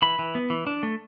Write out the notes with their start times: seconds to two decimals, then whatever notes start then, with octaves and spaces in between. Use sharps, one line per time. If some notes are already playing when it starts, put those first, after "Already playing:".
0.02 E3 B5
0.19 E3
0.35 B3
0.50 E3
0.67 D4
0.83 A3